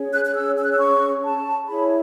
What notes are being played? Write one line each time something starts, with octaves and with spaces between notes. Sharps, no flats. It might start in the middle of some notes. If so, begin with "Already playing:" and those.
Already playing: C#4 G#4 C#5
F#6
F#6
E6
E6
F#6
E6
C#6
A5
E4 G#4 C#5 B5